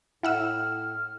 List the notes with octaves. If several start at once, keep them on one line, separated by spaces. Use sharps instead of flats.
A2 E4 F#5 E6 F6